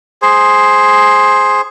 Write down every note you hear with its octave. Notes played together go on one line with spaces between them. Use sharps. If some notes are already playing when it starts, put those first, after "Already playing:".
G#4 C5